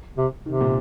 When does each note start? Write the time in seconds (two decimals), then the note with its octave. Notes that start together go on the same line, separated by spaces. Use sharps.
0.18 C3
0.46 C3 D#3
0.61 A#2